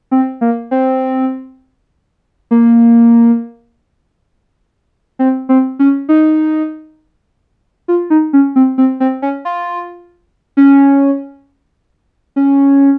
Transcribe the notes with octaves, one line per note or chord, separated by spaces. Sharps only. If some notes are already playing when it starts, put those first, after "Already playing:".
C4
A#3
C4
A#3
C4
C4
C#4
D#4
F4
D#4
C#4
C4
C4
C4
C#4
F4
C#4
C#4